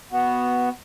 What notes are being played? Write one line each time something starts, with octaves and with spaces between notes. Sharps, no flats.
B3 F#4